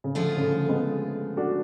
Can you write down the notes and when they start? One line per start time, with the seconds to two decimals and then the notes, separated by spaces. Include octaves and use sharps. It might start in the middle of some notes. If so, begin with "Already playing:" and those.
0.04 C#3
0.15 D3 F3 A3 F4 G#4
0.37 C#3
0.41 D3
0.69 G#3 B3
1.37 D4 F#4